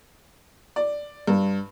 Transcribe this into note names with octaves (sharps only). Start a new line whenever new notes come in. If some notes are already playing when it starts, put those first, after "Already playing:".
D5
G2